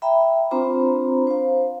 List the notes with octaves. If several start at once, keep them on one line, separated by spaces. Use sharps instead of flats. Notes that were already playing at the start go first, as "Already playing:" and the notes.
E5 G5 A#5 B5
C4 D4 F4 C5 A#5 B5
C5 F5